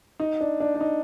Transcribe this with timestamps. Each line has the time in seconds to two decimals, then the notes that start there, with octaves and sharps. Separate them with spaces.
0.20 D#4
0.41 D4
0.60 D4
0.75 D4
0.81 D#4